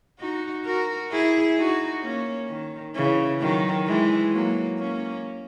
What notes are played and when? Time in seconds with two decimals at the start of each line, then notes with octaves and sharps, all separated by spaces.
0.20 D#4 F#4
0.65 F#4 A#4
1.11 E4 G#4
1.57 D#4 F#4
2.03 A#3 C#4
2.48 D#3
2.95 C#3 E3
3.40 D#3 F#3
3.86 E3 G#3
4.32 F#3 A#3
4.79 A#3 C#4